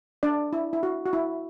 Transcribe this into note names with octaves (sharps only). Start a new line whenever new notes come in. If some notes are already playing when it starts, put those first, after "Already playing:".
D4 D5
E4
E4
F#4
F#4
E4